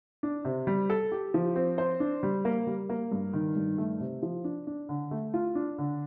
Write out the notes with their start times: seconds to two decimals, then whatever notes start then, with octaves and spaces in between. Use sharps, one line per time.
0.23 D4
0.45 C3
0.67 G3
0.90 A4
1.12 G4
1.34 F3
1.56 C4
1.78 C5
2.00 D4
2.23 G3
2.45 A#3
2.67 G3
2.89 A#3
3.12 G2
3.33 D#3
3.56 G2
3.78 A3
4.00 C3
4.22 F3
4.44 D4
4.67 D4
4.89 D3
5.11 A3
5.34 F4
5.55 D4
5.78 D3